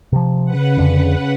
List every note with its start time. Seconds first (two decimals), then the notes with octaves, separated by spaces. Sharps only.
0.12 C3 F3
0.45 C#3 B4 F#5
0.78 F2 D3